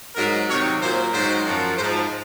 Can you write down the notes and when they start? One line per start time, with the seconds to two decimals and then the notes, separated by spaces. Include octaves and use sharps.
0.16 G#2 F#3 A#4
0.48 C3 D#3 F#3 C#5
0.80 A#2 F#3 C5
1.12 G#2 D#3 F#3 C5
1.44 F#2 F3
1.76 G#2 C5
1.82 F3